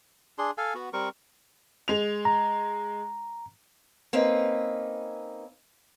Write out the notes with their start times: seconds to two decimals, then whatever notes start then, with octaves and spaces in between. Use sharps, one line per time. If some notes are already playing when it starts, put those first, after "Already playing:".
0.38 D4 G#4 C6
0.58 A4 F5 G#5
0.75 B3 F#4
0.93 G3 C4 A#4 C#6
1.88 G#3 F7
2.25 A#5
4.13 A#3 C4 C#4 D#4 B4